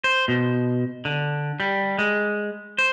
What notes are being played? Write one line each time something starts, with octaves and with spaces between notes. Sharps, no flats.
C5
B2
D3
G3
G#3
C5